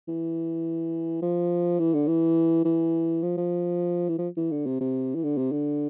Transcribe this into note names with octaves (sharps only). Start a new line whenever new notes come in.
E3
F3
E3
D3
E3
E3
F3
F3
E3
F3
E3
D3
C3
C3
E3
D3
C3
D3